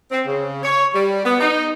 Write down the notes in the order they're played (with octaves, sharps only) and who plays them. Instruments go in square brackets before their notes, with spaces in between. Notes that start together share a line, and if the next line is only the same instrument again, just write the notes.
[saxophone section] C4
C#3
C#5
G3
B3
D#4